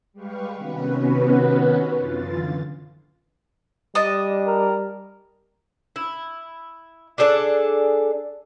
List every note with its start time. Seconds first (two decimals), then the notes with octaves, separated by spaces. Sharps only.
0.13 G3 G#3 G4 B4 F5 C#6
0.55 C3 D#3 B3 C#4 F#4 B4
1.97 F#2 D3 E3 F4 A6
3.95 G3 D4 D#5
4.47 A#4
5.96 E4
7.18 D4 G#4 A4 D5